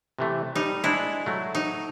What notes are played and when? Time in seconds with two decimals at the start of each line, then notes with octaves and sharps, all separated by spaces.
0.19 C3 E3 A3
0.55 G3 D#4
0.84 G#3 D4 E4
1.26 F#3 A3
1.55 D#4